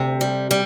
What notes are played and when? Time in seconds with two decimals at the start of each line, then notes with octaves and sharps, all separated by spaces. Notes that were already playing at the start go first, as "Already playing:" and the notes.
Already playing: D2 C3
0.21 G3
0.51 G3